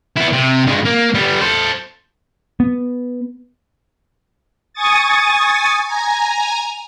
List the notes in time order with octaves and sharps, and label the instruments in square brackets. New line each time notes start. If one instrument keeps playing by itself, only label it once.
[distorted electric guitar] B3 E4
C3
G2 G#3
A#3
G3 B3
A4 C5
[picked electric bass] B3
[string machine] G#5 C#6 D#6 A6
G#5 A#5